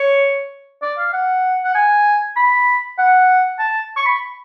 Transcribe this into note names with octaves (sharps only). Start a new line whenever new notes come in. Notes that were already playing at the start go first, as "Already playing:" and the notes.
Already playing: C#5
D5
F5
F#5
F#5
G#5
B5
F#5
A5
C#6
B5